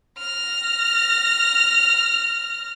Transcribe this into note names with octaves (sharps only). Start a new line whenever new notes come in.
F6 A#6